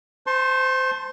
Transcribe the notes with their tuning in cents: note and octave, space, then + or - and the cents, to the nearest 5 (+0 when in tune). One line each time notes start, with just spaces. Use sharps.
C5 -20 A5 +0 C6 +35